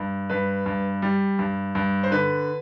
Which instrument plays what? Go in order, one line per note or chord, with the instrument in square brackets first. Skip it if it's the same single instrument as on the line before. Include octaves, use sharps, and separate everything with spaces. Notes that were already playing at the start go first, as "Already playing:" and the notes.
Already playing: [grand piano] G2
G2 B4
G2
G3
G2
G2
C5
D3 B4